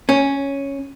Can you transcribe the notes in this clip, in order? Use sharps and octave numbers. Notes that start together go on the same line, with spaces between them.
C#4